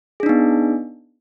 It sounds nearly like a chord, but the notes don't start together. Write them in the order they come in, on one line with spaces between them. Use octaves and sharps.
G#4 D4 D#4 B3